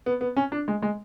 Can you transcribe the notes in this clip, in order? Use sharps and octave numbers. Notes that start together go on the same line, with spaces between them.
B3
B3
C#4
D4
G#3
G#3